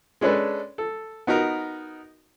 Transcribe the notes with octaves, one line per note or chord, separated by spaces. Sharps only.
G#3 C#4 D4 A4 B4
A4
B3 D#4 F#4 A#4